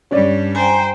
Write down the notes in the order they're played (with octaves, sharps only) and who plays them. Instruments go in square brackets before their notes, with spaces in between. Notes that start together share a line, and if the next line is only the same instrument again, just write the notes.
[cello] G2 G3 [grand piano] C#4 D5
[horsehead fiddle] C5 G5 [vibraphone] G#5 A#5